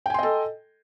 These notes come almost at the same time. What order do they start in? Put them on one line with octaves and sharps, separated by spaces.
G5 G#5 C6 D#5 A4